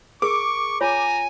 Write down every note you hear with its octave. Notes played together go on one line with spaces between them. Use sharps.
G#4 A#4 C#6 D6
F4 C#5 G#5 A#5